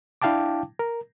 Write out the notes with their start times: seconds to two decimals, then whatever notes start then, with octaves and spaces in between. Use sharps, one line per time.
0.22 D4 E4 F5 G5 A5 D6
0.79 A#4